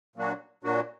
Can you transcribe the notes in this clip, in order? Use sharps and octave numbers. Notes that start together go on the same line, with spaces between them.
A#2 F#3 A#3 D4 F#4
A#2 F#3 A#3 D4 F#4